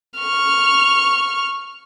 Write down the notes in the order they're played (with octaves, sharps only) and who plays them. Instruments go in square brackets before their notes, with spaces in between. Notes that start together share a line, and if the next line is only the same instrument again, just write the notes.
[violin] C#6 F6